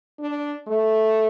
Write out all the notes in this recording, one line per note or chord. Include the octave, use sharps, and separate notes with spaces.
D4
A3